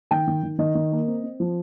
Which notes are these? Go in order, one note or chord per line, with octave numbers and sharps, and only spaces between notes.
D#3 G5
D#3
D#3
D#3 D#5
D#3
A#3
C4
C4
F3